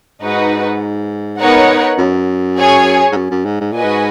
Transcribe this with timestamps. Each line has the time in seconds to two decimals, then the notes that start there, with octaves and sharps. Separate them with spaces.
0.22 G#2 D#4 F#4 B4 F#5
1.40 B3 D#4 A#4 C#5 F#5
1.98 F#2
2.57 G#4 C#5 G#5
3.12 G#2
3.16 F#2
3.31 F#2
3.45 G#2
3.60 G#2
3.72 A#2 F#4 B4 D#5 G#5
3.84 G#2